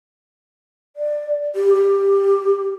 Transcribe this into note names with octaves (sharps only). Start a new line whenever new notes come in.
D5
G4
G4